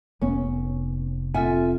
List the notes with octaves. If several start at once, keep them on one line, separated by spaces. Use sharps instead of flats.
F1 B3 C#4
C4 F4 A4 E5 F#5 G#5